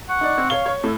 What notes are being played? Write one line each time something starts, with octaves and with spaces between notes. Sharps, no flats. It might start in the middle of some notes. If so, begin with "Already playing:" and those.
F#5 C#6
D#4 D5
C4
C#5 F5 G7
C#5 G#6
A2 A4